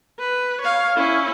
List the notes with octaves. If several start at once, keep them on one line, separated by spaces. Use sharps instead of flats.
B4
C#5 F5
C#4 E4